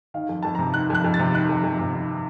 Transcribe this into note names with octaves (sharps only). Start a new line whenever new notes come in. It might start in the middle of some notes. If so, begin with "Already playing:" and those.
D#3 F5
F2
F2 A5
A#5
C3
D#3 F#6
F2 F#6
F2
A6
C3
D#3 F#6
F2
F2
C3
D#3